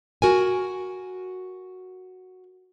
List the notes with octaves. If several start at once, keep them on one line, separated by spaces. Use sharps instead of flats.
F#4 A#4 G#5